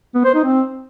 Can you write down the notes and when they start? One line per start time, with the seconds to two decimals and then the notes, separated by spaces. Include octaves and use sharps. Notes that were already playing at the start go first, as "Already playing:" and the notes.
0.15 B3
0.25 C5
0.34 D#4
0.44 C4